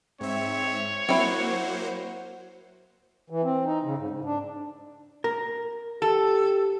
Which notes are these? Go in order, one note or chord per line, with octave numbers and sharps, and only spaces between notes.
G#2 C4 C#5 E5
F#3 A#3 C4 E4 C5 F#5
E3
C4
D#4
C#3
G#2
G#2
D4
A#4
G4 A4